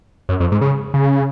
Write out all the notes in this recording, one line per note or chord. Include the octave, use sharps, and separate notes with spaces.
F#2
F2
G#2
C#3
C#3